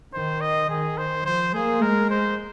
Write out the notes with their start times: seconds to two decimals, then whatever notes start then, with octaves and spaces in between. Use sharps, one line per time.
0.14 D#3 C5
0.41 D#5
0.69 D#3 G#4
0.97 C5
1.25 F3 C5
1.54 A#3 G#4
1.82 G#3 A#4
2.10 C5